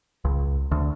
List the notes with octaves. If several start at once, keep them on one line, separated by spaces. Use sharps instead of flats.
C#2
D2